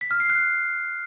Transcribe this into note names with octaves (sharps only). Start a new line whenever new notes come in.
B6
F6
C7
F#6